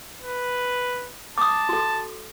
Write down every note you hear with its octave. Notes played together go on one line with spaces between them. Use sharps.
B4
A5 D6 D#6
F#4 A4